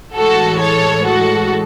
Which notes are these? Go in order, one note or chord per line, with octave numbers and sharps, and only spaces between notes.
A2 E3 G#3 F#4 A4
A4 C#5
F#4 A4